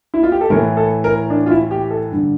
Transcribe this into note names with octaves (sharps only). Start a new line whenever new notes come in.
E4
F4
G4
A4
A2 E3 A#4
A4
A#4
D4
F4
E4
G4
A4
G2 D3